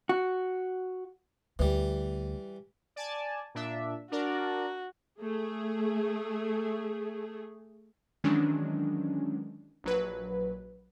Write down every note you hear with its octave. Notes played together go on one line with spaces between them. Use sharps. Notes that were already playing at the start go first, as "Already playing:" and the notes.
F#4
D2 E3 G3
D5 G#5 A5
A#2 D4 E5
D4 F#4 A#4 D5
A3 G#4
D#3 E3 F#3 G#3 C#4 D4
A#1 F#3 B4